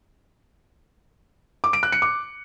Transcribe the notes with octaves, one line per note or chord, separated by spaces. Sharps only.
D6
D7
F#6
C#7
D6